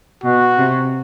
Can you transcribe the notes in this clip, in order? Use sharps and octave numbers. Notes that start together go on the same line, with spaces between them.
B2 F#4
C3